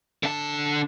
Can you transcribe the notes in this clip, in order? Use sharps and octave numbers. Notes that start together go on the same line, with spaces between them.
D3 A5